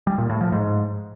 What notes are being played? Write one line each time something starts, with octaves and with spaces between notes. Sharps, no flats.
G3
A#2
A2
F3
G#2